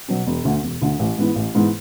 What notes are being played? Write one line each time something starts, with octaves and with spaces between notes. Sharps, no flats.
B2 F#3
E1
D2 D3
E1
D2 D3
A1
G#2 E3 B3
A1
G#2 E3 B3